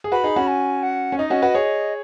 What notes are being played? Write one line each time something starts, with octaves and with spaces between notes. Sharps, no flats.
G#4
F#4 B4 B5
D#4 G#4
C#4 F#4
G#5
F#5
C#4
D#4 D#5
C#4 F#4
F#4 B4
G#4 C#5